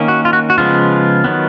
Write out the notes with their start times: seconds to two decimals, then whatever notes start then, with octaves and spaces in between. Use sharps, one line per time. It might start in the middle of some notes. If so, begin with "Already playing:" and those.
Already playing: D#3 A#3 C#4
0.08 F#4
0.25 F4
0.33 F#4
0.50 F#4
0.58 C#3 F3 G#3 B3 F4
1.24 D#3 F#3 B3